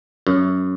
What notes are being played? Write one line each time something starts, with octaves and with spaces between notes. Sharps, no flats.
F#2